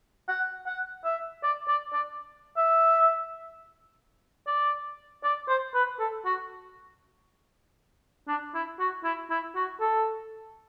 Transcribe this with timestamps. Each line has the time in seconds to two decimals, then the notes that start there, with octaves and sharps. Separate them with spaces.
0.28 F#5
0.66 F#5
1.04 E5
1.43 D5
1.68 D5
1.93 D5
2.57 E5
4.47 D5
5.24 D5
5.48 C5
5.74 B4
5.99 A4
6.25 F#4
8.28 D4
8.54 E4
8.79 F#4
9.04 E4
9.30 E4
9.55 F#4
9.80 A4